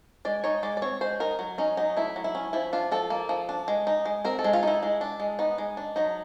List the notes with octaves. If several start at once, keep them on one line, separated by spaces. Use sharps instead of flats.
G#3 D5
D#4 C#5
G#3 D5
D5
C4 C#5
G#3 C5
D#4 A#4
F#3
C#4 D#4
F#3 D#4
A3 E4
F#3
E4
C#4
F3 E4
D4 F4
F3 A4
A#3
F3
D4
G#3
D#4
G#3
C4 A#4
A4
G#3
F4
D#4 E4
G#3
D4
G#3
B3 D#4
G#3
D4
F#3 D#4